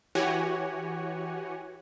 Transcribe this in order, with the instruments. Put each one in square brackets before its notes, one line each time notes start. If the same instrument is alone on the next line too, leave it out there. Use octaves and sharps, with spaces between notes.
[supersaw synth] E3 F#4 G4 C#5 F#5 G#5